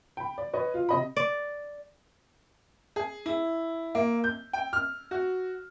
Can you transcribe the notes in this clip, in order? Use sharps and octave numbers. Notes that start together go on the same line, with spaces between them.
G5 B5
D5
B4 C#5 D#5
F4 F5
C3 D#5 B5
D5
G#4
E4
A#3
G6
G5
F6
F#4